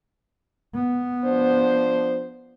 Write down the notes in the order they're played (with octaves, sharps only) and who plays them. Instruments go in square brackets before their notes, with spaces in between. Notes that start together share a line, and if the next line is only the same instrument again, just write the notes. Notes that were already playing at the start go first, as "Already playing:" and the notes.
[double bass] B3
[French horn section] F3 D4 C5